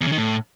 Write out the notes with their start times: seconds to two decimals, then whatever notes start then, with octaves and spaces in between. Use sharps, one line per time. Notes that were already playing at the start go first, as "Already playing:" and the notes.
0.01 E2
0.07 C#3
0.12 D#3
0.17 A2